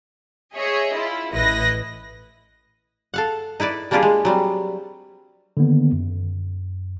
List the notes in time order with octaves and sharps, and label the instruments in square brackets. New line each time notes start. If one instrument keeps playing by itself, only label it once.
[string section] G#4 C#5 D#5 E5
E4 F4
A1 E4 B4 D#5 A#6
[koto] A4 F5 F#5
D#4 E4 B4 D5
G3 A#3 D4 F4 G4 G#4
G#3
F#3 G3 C4
[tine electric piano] D3 D#3 A#3 B3
F#2